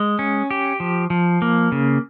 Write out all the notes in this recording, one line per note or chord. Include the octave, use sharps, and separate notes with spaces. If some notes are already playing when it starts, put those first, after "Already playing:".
Already playing: G#3
C#4
G4
F3
F3
A#3
C#3